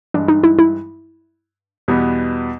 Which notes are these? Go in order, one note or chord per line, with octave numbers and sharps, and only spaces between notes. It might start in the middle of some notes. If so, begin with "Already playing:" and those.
G2 E3 G#3 D4
D#4
E4
E4
E2 B2 G3 B3